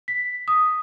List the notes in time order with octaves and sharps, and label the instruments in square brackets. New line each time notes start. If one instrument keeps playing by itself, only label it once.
[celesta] B6
D#6